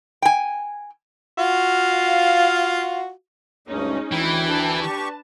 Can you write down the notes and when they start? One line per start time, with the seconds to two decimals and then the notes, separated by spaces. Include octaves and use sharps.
0.22 G5 G#5
1.38 F4 F#4 F5
3.68 D2 G2 G#3 C#4 D#4
4.12 D2 E3 E4 G5
4.43 D4 B4 A5
4.82 G4 C#6